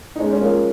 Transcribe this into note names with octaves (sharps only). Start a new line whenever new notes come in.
D#4
G#3 C#4
C#4
F3 A#3